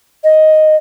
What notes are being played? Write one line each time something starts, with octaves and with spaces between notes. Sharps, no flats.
D#5